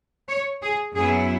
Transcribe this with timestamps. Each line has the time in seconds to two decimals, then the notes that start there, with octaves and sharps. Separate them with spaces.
0.28 C#5
0.62 G#4
0.95 F#2 F#3 B3 E4 G#4